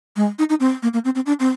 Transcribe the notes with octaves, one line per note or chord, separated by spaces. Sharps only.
G#3
D#4
D#4
C4
A#3
A#3
C4
C4
D4
C4